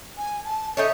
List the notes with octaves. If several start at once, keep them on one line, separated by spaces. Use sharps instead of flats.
G#5
A5
D#4 A4 C#5 E5